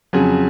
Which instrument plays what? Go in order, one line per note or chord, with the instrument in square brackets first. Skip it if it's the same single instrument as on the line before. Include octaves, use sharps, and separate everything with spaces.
[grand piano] F2 C#3 F#3 G#4